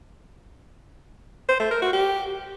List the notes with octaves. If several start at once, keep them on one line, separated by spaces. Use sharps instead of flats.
C5
A3
A#4
F#4
G4